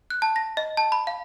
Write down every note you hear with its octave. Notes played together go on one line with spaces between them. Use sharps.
F#6
A5
A#6
D#5
A5
B5
F5